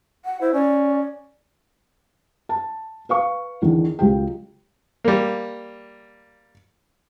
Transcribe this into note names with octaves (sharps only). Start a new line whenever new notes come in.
F#5
E4 C5
C#4 D5
A5
B4 F5 C#6
E2 D3 D#3
C#2 F#3 G4 G5
G3 A#3